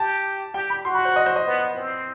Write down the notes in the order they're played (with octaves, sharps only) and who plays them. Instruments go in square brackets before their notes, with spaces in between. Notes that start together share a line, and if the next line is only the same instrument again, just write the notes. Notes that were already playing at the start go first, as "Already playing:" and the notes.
Already playing: [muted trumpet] G4 [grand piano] A5
[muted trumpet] G4 [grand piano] G5
[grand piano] B5
[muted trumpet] F#4 [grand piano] C6
[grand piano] B5
C5
D#5
C5
D#5
[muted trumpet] B3
C4